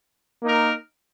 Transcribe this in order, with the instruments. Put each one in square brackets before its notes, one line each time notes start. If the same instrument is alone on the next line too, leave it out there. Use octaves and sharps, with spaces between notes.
[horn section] A#3 D#4 A#4